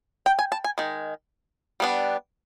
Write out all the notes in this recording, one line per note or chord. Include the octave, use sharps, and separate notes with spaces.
G5
G#5
A5
G#5
D#3 G#3
G3 B3 D4